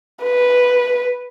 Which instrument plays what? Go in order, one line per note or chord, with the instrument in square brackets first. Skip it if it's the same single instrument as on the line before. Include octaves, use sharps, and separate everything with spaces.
[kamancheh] B4